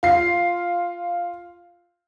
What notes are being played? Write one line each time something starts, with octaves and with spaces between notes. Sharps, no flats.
F4 C7